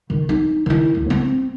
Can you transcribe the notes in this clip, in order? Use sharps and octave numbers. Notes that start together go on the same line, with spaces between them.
D#3
D#4
D#3 E4
D2
C4